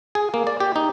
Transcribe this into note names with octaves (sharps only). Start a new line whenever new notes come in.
G#4
A#3
D5
G4
D#4